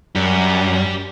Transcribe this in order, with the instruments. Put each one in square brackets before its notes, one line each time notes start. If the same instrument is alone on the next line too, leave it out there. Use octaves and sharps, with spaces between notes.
[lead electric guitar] F#2 [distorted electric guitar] G4 D5